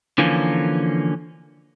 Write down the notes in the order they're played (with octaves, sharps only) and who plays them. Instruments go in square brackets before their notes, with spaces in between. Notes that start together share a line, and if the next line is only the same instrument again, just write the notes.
[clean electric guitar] D3 E3 F3 A#3 C#4